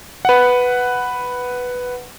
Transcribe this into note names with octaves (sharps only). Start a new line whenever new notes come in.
B4 F#5